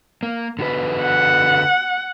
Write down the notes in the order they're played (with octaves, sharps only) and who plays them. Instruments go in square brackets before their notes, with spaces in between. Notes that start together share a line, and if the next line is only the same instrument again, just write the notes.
[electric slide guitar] A#3
D3 F#4 B4
[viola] F#5